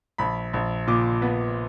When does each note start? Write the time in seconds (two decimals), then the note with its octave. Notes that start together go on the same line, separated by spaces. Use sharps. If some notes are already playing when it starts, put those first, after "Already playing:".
0.18 A#1 B5
0.53 A#1
0.87 A#2 D6
1.22 B3